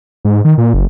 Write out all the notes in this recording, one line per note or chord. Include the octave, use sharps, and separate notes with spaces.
G#2
D#3
A#2
F#1